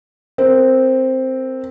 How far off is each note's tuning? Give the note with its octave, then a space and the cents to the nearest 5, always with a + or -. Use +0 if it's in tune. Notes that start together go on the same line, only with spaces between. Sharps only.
C4 +0 A#4 -10